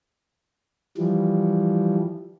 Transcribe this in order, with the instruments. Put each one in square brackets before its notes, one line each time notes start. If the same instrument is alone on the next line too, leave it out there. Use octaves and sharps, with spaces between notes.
[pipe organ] E3 F3 G3